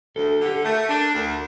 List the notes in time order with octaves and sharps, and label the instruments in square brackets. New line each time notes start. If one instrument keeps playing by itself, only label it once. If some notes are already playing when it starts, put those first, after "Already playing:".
[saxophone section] D2 [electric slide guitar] A4
[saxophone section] D3
[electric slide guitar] G4
A4
[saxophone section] A3 [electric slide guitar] A#4
[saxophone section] D4
D2